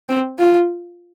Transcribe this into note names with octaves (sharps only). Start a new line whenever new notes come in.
C4
F4